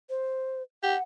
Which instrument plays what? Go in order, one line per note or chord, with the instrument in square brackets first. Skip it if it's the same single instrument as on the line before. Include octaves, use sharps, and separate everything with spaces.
[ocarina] C5
[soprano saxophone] G4 [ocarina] F#5